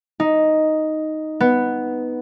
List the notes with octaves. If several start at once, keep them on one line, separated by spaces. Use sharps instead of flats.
D#4
B3